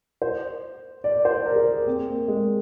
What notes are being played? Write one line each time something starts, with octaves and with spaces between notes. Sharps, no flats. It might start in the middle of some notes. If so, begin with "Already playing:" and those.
C5
D5
C5
A#4
G#4
A#4
C4
A#3
G#3